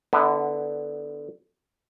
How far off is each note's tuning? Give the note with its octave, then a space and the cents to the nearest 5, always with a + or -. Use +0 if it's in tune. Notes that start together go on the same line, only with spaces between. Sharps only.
D3 +0 B3 +0 E4 -40